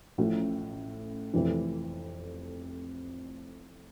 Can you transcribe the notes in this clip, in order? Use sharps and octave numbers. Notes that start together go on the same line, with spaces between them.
A1 A2 F3 C#4
F1 F2 E3